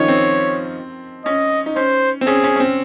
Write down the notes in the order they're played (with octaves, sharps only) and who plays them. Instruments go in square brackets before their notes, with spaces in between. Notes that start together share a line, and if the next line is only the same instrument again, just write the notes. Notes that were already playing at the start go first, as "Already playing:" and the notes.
Already playing: [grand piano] D#3 F3 C#4 D#4 F4 [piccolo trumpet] C#5
[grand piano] C4
[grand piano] C#4 [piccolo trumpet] D#5
[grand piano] D#4
[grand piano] C#4 [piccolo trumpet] C5
[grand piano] C4
[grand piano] C#4 [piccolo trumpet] G#4
[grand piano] C#4
C#4
C4